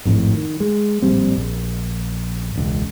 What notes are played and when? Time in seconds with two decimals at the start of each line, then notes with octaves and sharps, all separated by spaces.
0.05 G#1 F2 A2
0.34 D#3
0.60 G#3
1.02 D1 A#1 G3 C4
1.36 A#1
2.56 E1 C#2